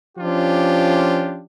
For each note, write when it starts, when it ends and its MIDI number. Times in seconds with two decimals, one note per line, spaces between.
0.18 1.42 53
0.18 1.42 61
0.18 1.42 62
0.18 1.42 65
0.18 1.42 67